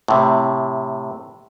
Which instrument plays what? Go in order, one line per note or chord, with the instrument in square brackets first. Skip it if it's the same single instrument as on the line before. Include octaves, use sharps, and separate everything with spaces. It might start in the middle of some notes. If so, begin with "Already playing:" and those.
[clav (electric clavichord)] A2 C3